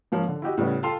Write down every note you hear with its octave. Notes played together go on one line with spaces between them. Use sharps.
G#2 F3 A#3 C#4
D3
E4 F#4 G4 D#5
A2 C#3 G3 B3 C#4
F4 A4 F5 G5 A5 C6